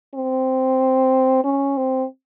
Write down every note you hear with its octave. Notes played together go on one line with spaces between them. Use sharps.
C4
C#4
C4